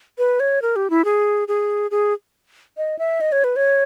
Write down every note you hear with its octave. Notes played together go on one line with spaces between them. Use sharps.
B4
C#5
A#4
G4
E4
G#4
G#4
G#4
D#5
E5
D#5
C#5
B4
C#5